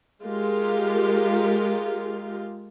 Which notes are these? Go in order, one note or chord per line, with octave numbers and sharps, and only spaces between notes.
G#3 F4 G4 A#4